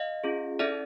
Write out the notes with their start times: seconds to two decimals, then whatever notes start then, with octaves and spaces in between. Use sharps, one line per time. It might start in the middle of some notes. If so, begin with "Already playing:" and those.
Already playing: D#5 F5
0.24 C#4 F4 G#4
0.59 C#4 E4 A4 D5 E5